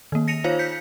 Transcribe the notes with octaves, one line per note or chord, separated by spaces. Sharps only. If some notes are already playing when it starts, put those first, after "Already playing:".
D#3 A#3
A#6 C#7 D#7 F7
D#4 F4 C5 C#5 F5
G6 B6 C#7